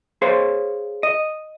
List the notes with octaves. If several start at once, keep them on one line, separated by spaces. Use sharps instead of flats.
G#4 C5 C#5 F5
D#5